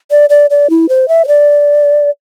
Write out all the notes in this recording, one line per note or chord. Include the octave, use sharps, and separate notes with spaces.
D5
D5
D5
E4
C5
E5
C5
D5